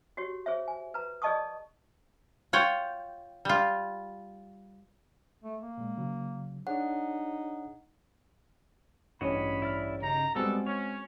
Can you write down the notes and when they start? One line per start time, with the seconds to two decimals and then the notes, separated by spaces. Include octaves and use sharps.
0.17 F#4 G4 C#5
0.46 G#4 C5 C#5 E5
0.68 G#5
0.94 B4 A#5
1.22 G#4 D5 D#5 A5 C#6 D#6
2.53 F4 C#5 F#5 G5
3.45 G3 F4
5.44 A3
5.61 A#3
5.78 A#2 G#3
5.97 C#3 F#3
6.67 D4 D#4 G#4 C#5 F#5
9.21 A1 G2 C#4 F#4 C#5 D#5 B5
9.62 E4 D5 F6
10.03 C#3 D#4 A#5
10.35 G3 G#3 B3 C4 F#4 A4
10.67 C#4 C#5